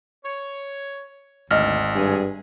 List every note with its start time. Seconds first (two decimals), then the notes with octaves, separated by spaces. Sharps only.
0.25 C#5
1.51 G#1 D2 D#5 F6
1.96 G2 G#4